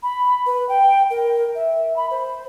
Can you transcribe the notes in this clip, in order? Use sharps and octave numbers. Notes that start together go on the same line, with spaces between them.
B5
B4
G5
A#4
E5
B5
C5